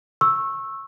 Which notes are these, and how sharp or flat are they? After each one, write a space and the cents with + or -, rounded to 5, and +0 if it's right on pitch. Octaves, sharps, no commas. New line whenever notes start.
C#6 -20 E6 +0